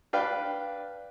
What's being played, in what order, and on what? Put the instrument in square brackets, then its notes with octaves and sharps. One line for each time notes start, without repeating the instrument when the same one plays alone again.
[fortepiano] D4 B4 F5 G5